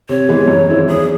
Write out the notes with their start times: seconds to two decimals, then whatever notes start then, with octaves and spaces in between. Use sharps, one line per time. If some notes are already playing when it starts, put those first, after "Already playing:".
0.09 C3 C#5
0.29 E3 G#3 B3
0.48 F#2
0.67 D#3 G#3 C4 E4
0.88 E2 G#4